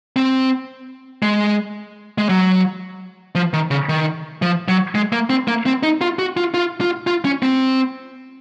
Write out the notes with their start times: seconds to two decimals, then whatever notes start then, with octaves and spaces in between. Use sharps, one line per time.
0.16 C4
1.22 G#3
2.18 G#3
2.29 F#3
3.35 F3
3.53 D#3
3.71 C#3
3.89 D#3
4.42 F3
4.68 F#3
4.95 G#3
5.13 A#3
5.30 C4
5.48 A#3
5.66 C4
5.83 D#4
6.01 F4
6.19 F#4
6.37 F4
6.54 F4
6.81 F4
7.07 F4
7.25 C#4
7.43 C4